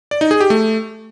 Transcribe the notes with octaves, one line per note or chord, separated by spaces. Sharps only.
D5
D#4
G#4
G4
A3